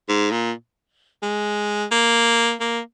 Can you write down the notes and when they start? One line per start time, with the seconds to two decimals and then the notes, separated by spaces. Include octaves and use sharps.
0.09 G#2
0.31 A#2
1.23 G#3
1.92 A#3
2.61 A#3